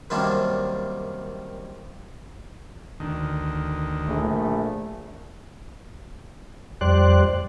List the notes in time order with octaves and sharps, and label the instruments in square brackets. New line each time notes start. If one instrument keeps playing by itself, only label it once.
[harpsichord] F#2 C3 D#3 G3 A#3 D4
[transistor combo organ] D2 D#3
[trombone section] A#1 A3
[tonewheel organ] F2 G3 C5 D5 F#6